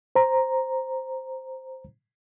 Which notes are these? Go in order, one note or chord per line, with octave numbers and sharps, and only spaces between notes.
C5 A#5